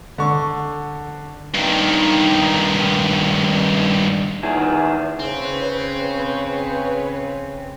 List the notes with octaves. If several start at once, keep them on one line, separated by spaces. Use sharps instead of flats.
D3 C#6
G2 D#3
D#3 E4 G#4
C#3 C4 B4 C#5